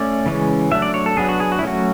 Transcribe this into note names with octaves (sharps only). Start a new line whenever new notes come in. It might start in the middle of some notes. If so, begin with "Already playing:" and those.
Already playing: A3 C#4 D5
C#3 E3 G#3 C#4
F#3 A3 D4 E5
D5
C#5
A4
F#3 B3 D4 G#4
F#4
G#4
F#4
E4
F#3 A3 C#4 F#4